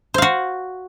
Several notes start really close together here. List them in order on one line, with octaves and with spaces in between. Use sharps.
C5 F5 F#4